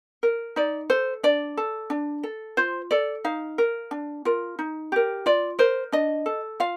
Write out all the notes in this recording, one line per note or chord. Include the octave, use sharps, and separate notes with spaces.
A#4
D#4 D5
A4 C5
D4 D5
A4
D4
A4
F4 C5
A4 D5
D#4 F5
A#4
D4
F4 A#4
D#4
G4 A#4
F4 D5
A#4 C5
D4 D#5
A4
F4 F5